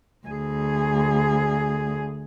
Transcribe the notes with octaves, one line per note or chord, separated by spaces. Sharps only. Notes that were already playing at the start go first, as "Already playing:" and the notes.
D2 G#4